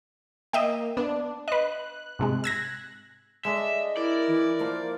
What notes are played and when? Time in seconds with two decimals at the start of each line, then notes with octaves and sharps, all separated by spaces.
0.53 A#3 D#5 E5 G5
0.97 B3 D4
1.48 B4 D#5 F#6
2.19 G#2 C3 G#3
2.44 E6 G#6 A#6
3.45 G#3 D4 A4 D#5 E5
3.97 E4 A#4 D5
4.28 E3
4.60 F3 A#3 A#4